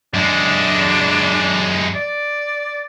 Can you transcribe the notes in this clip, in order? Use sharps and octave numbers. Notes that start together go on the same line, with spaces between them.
F#2 G#3 D4
D5